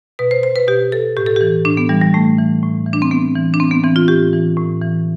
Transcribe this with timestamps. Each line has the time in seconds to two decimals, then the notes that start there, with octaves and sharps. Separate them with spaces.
0.19 B2 B4
0.31 C5
0.43 C5
0.56 B4
0.68 B2 G4
0.92 A4
1.17 A2 G4
1.26 A4
1.36 G4
1.41 E3
1.65 A2 D4
1.77 B3
1.89 E3 G3
2.01 G3
2.13 A2 A3
2.38 E3
2.63 A2
2.86 E3
2.93 D4
3.02 C4
3.11 A2 B3
3.35 E3
3.54 D4
3.60 A2 C4
3.71 B3
3.84 E3 C4
3.96 F4
4.08 A2 G4
4.33 E3
4.57 A2
4.82 E3